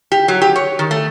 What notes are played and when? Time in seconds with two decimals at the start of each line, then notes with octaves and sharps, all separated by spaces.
0.12 G4
0.28 F#3
0.42 G4
0.56 C#5
0.79 D#3
0.91 A3